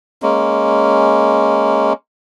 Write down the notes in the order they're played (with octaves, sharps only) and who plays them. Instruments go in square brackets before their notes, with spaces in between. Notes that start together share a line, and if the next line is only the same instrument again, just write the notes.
[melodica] G#3 A#3 C#4